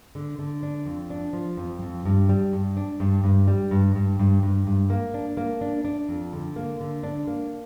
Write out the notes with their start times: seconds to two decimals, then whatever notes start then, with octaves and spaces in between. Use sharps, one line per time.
0.15 D3
0.39 D3
0.63 D4
0.86 F2
1.10 D4
1.33 F3
1.57 F2
1.82 F2
2.05 G2
2.29 G3
2.53 G2
2.77 D4
3.00 G2
3.24 G2
3.48 G3
3.71 G2
3.95 G2
4.19 G2
4.43 G2
4.67 G2
4.90 A#3
5.14 D4
5.37 A#3
5.61 D4
5.85 D4
6.09 F2
6.32 D3
6.56 A#3
6.80 D3
7.03 D4
7.27 A#3